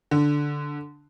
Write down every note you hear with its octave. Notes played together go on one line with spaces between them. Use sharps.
D3